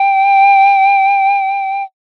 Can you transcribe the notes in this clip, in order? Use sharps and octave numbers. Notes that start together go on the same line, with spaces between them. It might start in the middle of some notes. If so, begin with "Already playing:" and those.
Already playing: G5